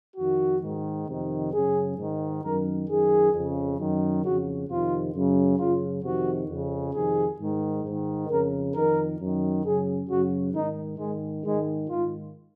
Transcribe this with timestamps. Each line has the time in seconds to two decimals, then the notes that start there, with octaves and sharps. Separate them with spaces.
0.17 F2 D#3 F#4
0.62 G#2 D#3
1.08 F2 C3 D#3
1.52 F#2 C#3 G#4
1.97 G#2 D#3
2.42 F#2 D#3 A#4
2.87 F#2 D#3 G#4
3.33 F2 C#3
3.78 F#2 D#3
4.22 F2 C#3 F#4
4.68 F2 C3 D#3 F4
5.13 F#2 C#3
5.58 F#2 C#3 F4
6.03 F2 C3 D#3 F#4
6.48 F2 C#3
6.93 F2 C3 D#3 G#4
7.39 G#2 D#3
7.84 G#2 D#3
8.29 F2 C#3 A#4
8.74 F2 D#3 A#4
9.19 F#2 D#3
9.63 F#2 C#3 G#4
10.08 F#2 C#3 F#4
10.54 G#2 D#3 D#4
10.98 G#2 D#3 G#3
11.44 G#2 D#3 G#3
11.89 G#2 D#3 F4